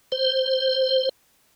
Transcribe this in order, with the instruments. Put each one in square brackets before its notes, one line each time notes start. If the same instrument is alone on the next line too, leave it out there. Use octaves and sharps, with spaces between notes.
[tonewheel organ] C5